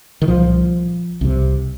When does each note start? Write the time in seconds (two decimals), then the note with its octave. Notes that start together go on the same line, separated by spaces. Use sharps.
0.22 D#3
0.28 C2 A#2 F3
1.21 C2 C3